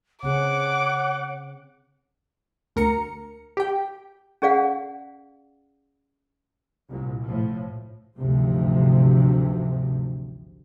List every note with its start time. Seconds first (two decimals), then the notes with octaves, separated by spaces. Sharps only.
0.23 C#3 C4 G#4 C#5 F#5 D6
2.76 D2 A#4 A#5 C#7
3.57 G4 G5
4.42 C#4 G#4 D5 F5 F#5
6.89 C2 A#2
7.23 A2 F3
8.17 A1 D2 G#2 C3 F3